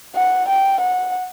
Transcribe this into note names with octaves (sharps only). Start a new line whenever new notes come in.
F#5
G5
F#5